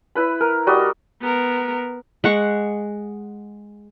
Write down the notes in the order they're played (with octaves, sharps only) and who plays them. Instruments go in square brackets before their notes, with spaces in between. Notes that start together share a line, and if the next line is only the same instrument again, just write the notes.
[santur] E4 B4 B5
A#4
G3 F#4 D#5
[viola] B3 A#4
[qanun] G#3 F#5 C#6